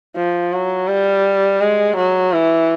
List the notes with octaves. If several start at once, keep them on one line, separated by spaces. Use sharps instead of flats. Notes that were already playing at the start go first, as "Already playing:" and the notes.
F3
F#3
G3
G#3
F#3
E3